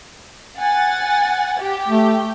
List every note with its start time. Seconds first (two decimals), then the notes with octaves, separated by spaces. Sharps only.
0.59 F#5 G#5 A6
1.58 G4 G5
1.88 A3